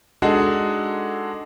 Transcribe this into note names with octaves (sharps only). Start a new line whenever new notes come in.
G#3 D4 D#4 F#4 A4